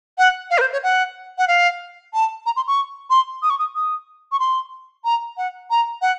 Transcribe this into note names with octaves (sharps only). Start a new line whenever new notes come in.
F#5
F5
A#4
C5
C#5
F#5
F#5
F5
A5
A#5
C6
C#6
C6
D#6
C#6
D#6
D#6
C#6
C6
A#5
F#5
A#5
F#5